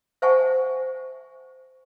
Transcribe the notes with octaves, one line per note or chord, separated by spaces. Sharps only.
C5 E5 F#5 G#5 A5 C#6